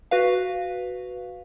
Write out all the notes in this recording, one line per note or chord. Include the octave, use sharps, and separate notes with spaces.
F#4 B4 F5